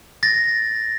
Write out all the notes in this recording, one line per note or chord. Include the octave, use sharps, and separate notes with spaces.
A6 A#6